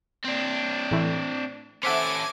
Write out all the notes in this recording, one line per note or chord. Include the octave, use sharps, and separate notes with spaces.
C4 D4
A2 E3 A3
C#4 A4 C5 E5 F#5 G#5 D6